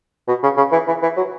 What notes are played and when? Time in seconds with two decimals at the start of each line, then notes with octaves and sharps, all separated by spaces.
0.28 B2
0.43 C#3
0.57 C#3
0.72 E3
0.87 E3
1.03 E3
1.17 F#3